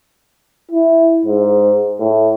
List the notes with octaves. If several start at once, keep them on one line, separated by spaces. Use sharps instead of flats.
E4
G#2
A2